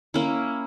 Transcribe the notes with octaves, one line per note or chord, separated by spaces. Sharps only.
A#3 C#4 E4